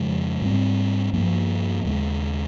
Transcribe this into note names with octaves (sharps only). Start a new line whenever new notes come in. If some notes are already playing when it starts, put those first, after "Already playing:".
Already playing: F2 C#3 F3 G#3
G#2 G3 C4
G2 F3 A#3
D#2 C#3 G#3